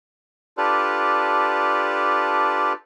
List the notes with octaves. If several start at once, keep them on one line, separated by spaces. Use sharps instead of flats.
D4 F4 G4 A4 B4 D5